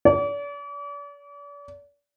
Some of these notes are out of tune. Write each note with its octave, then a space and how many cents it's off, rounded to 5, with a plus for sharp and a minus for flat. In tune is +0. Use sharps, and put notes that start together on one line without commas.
D5 -40